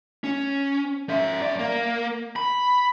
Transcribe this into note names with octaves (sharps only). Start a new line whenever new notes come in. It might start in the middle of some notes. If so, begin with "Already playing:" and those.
C#4
C#4 E5
F#2 D5
A#3
B5